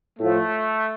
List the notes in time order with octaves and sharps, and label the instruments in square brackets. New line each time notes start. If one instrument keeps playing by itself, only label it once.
[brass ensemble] A2 F3 A3